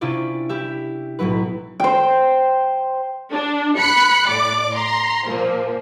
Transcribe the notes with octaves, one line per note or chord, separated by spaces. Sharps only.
C3 C#4 D4 E4 F4 D5
E4 G4 E5
B1 A2 F#3 E4 B4
C5 G5
D4
B5 F#6 C#7
A2 D5 D6
A#5 C6
A#2 F3 A#3